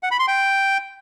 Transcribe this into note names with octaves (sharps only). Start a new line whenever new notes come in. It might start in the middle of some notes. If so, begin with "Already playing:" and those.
F#5
B5
C6
G5